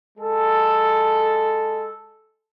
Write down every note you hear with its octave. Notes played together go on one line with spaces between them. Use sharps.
G#3 A4